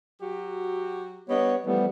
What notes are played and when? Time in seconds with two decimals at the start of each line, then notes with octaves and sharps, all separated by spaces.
0.21 F#3 F#4 G4
1.29 G3 B3 D4 C#5 D#5
1.66 E3 F3 G3 A3 B3